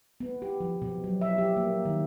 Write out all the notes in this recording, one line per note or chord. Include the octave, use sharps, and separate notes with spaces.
B3
G4
F3
B2
F#3
E5
G4
A#3
D#3